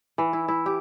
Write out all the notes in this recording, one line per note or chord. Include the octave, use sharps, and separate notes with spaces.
E3
E4
E4
G4